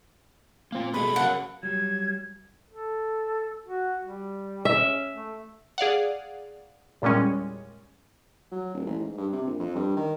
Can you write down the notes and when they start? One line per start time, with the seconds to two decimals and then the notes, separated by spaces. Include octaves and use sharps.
0.72 A#3 C4 F4 F5
0.94 B2 G#3 A#3 G#4 A4 B5
1.16 C#3 F#3 A#4 F5 F#5 A5
1.63 F#3 G3 G#6
2.71 A4
3.66 F#4
4.03 G3
4.65 C#4 E5
5.14 A3
5.78 G#4 D5 F5 F#5
7.02 E2 A#2 G3 G#3 C#4
8.52 F#3
8.74 D#1
8.87 A1
8.99 G#2
9.17 G2
9.33 C3
9.47 A#1
9.60 F2
9.75 G2
9.97 D#3